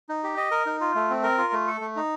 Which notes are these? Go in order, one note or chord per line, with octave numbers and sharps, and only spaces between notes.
D#4
G4
D#5
A#4
D#4
F4
A3
C4
A#4
F4
A3
A4
A3
D#4